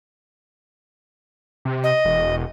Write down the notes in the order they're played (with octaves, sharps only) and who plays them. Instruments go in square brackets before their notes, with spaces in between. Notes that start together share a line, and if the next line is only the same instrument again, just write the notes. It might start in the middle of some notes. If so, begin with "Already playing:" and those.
[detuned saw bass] C3
[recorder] D#5
[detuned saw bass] E1